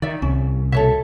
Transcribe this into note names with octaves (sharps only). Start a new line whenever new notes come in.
D#3 D5 E5
C2 C#4
B2 A4 C#5 E5